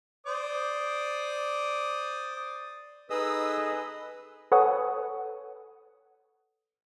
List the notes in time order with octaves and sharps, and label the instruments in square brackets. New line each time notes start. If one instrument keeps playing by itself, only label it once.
[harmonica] C5 D5 D#6
[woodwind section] D#4 A4 B4 [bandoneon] G#4 D#5 [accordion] D#6 E6
[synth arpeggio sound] A4 B4 C#5 F#5 G#5 D#6